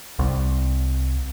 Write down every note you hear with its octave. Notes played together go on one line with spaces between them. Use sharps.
C2